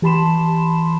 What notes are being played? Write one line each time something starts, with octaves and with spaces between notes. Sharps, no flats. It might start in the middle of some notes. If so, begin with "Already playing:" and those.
E3 G4 A5 B5 C6 E7